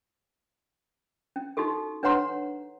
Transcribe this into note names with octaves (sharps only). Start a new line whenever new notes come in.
C#4
D#4 F#4 G4 A4
D4 B4 C#5 F#5 A#5 C6